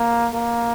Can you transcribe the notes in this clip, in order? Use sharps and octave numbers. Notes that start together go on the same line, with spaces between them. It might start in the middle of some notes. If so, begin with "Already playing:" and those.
Already playing: A#3
A#3